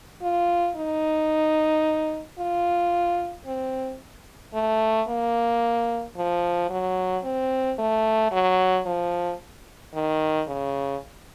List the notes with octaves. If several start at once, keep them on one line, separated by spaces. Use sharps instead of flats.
F4
D#4
F4
C4
A3
A#3
F3
F#3
C4
A3
F#3
F3
D#3
C#3